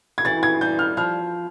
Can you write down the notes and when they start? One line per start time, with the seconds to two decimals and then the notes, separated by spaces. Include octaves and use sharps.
0.18 G#6
0.25 E3 A6
0.43 G#6
0.61 G3 G6
0.79 F6
0.97 F3 F6